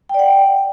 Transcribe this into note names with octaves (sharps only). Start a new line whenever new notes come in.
D5 F#5 G5